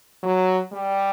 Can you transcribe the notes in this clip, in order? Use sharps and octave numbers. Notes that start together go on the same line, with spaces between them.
F#3
G3